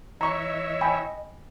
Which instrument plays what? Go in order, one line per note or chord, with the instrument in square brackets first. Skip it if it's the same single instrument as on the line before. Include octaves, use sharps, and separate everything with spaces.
[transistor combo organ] E3 C#5 E5 [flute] D#5 [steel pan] A#5 C#6
[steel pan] G5 G#5 B5